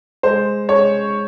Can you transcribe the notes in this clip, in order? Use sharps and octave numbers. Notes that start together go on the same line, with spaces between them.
G#3 C5
G#3 C#5